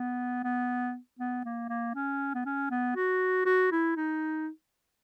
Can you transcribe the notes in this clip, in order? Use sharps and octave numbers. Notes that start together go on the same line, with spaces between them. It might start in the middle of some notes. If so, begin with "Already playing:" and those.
Already playing: B3
B3
B3
A#3
A#3
C#4
B3
C#4
B3
F#4
F#4
E4
D#4